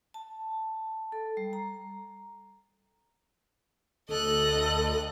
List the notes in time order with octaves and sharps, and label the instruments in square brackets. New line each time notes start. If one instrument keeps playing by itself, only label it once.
[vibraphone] A5
A4
G3
A#5
[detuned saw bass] D2 [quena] A4 [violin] D#5 F#6